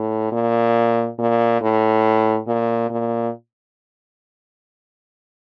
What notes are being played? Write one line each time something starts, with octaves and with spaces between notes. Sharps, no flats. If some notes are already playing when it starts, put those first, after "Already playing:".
Already playing: A2
A#2
A#2
A2
A#2
A#2